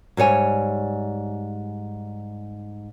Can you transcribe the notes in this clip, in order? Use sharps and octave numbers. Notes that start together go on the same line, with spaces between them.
G#2 G3 C#5 G#5